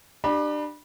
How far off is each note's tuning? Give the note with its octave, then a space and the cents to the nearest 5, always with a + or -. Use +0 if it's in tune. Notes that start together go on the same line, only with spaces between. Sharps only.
D4 +30 G4 -5 B5 -25